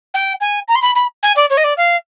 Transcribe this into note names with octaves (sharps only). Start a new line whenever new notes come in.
G5
G#5
A#5
C6
B5
B5
G#5
D5
C#5
D#5
D5
F5